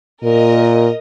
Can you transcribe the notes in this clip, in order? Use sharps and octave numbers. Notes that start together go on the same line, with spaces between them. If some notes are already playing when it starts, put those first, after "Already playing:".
A#2 A#4 D#5